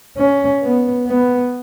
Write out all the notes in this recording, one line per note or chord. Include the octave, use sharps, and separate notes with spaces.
C#4
B3
B3